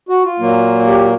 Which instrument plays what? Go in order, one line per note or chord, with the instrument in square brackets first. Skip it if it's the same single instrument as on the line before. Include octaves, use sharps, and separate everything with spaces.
[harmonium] F#4
F4
A#2 F#3 A#3
G4